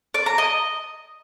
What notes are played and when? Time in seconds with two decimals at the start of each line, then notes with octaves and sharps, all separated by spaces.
0.14 D5
0.26 A#5
0.38 D#5